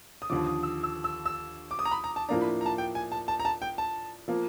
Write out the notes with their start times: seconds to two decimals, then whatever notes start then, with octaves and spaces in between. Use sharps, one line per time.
0.22 D#6
0.30 D#2 D3 F3 D6
0.46 D#6
0.63 E6
0.83 E6
1.04 E6
1.26 E6
1.71 D6
1.79 D#6
1.85 A#5
1.91 B5
2.04 A#5
2.16 A5
2.29 A2 F3 A#3 D4 A#5
2.41 B5
2.61 A#5
2.66 A5
2.78 G5
2.95 G#5
3.12 A5
3.28 A5
3.40 A#5
3.45 A5
3.62 G5
3.78 A5
4.28 F3 A#3